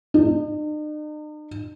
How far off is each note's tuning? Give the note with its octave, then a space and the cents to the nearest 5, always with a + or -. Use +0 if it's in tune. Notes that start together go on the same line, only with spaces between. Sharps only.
D#4 -45